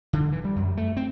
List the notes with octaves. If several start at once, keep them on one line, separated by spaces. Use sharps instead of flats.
D3
E3
G3
F#2
A3
C4